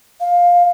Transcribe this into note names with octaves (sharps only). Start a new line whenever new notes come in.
F5